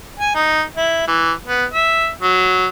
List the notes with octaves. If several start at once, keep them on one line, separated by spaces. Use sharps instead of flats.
G#5
D#4
E4
E3
B3
E5
F#3